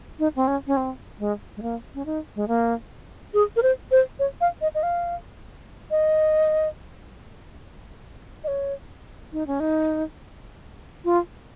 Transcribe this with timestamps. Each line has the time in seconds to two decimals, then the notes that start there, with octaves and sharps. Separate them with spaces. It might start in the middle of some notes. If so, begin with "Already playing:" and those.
0.19 D#4
0.36 C4
0.47 C#4
0.67 C#4
0.77 C4
1.19 G#3
1.57 G#3
1.62 A#3
1.95 C#4
2.06 D#4
2.36 G#3
2.48 A#3
3.34 G#4
3.56 A#4
3.63 C5
3.91 C5
4.19 C#5
4.41 F5
4.62 D#5
4.75 D#5
4.83 F5
5.91 D#5
8.44 D#5
8.48 C#5
9.33 D#4
9.47 C#4
9.60 D#4
11.05 F4